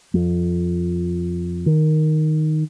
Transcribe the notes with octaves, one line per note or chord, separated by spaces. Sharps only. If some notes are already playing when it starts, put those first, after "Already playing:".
F2
D#3